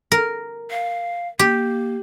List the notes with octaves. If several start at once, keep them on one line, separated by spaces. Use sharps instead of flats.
A#4
F5
A#3 G4